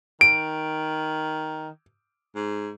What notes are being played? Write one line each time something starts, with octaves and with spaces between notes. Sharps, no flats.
D#3 D7
G#2